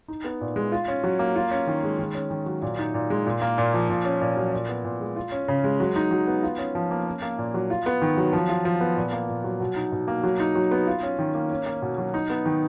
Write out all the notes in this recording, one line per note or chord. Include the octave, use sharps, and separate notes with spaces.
D#4
B3
A#2
G#3
F4
C#4
F#3
A#3
F4
C#4
D#3
G#3
D#3
C#4
D#3
F#3
A#2
D#4
A#2
G#3
A#2
A#3
A#2
F3
A#2
C#4
A#2
F#3
A#2
B3
A#2
G#3
F4
C#4
C#3
G#3
F#3
D#4
F#3
B3
F4
C#4
F3
A#3
C#4
A#3
A#2
F#3
F4
B3
D#3
F#3
F3
F4
F3
B3
A#2
A#3
A#2
F#3
B2
D#4
B2
A#3
F#3
D#4
F#3
B3
F4
C#4
D#3
A#3
C#4
A#3
B2
F#3
D#4
B3
D#3